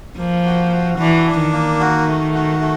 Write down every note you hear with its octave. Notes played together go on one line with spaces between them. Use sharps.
F3 A#3
F#4
F#4
E3 D4
D4
D#3
A#3
F#4
A3
F#4
A3